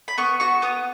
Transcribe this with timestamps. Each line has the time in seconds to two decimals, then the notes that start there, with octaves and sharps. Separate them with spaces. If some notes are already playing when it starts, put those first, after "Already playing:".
0.08 B5
0.18 B3 C#6
0.40 F#4 C#6
0.62 B3 D#6